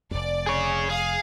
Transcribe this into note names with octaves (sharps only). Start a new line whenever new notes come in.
F1 F2 D5
G#4 C#5
G#4 F5